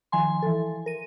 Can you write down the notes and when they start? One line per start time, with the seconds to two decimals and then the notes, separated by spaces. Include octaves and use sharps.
0.12 D#3 F3 G#5 C6
0.42 E3 A4
0.86 A#4 D#7